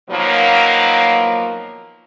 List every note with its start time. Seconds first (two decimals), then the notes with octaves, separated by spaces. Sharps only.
0.10 B2 D#3 F3 F#3 A#3